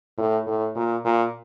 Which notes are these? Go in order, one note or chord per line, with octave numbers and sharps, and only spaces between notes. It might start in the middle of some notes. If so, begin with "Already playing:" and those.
A2
A2
A#2
A#2